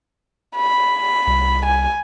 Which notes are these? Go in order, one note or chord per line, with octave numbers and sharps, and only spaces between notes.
B5
C2
G#5